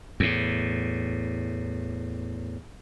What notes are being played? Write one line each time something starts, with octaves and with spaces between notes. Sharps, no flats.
E2 A2